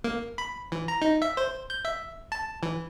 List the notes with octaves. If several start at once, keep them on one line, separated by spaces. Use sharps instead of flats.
A#3
B5
E3
A#5
D#4
E5
C5
G6
E5
A5
E3